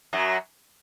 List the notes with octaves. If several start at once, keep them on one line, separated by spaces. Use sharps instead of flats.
F#2 F#3